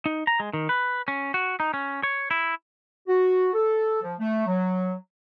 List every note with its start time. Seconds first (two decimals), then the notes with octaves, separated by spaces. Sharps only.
0.06 D#4
0.27 A#5
0.40 G#3
0.53 D#3
0.69 B4
1.08 C#4
1.34 F#4
1.60 D#4
1.74 C#4
2.03 C#5
2.31 E4
3.07 F#4
3.54 A4
4.02 F3
4.19 A3
4.46 F#3